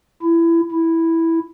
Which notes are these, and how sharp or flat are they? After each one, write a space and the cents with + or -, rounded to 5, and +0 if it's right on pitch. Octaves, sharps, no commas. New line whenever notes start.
E4 +20
E4 -5